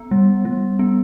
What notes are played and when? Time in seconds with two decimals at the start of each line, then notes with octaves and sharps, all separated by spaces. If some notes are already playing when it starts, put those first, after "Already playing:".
Already playing: B3
0.11 G3
0.45 G3
0.79 B3